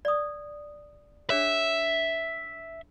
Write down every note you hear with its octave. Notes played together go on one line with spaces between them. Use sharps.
D5 D#6
D4 G#4 C#5 E5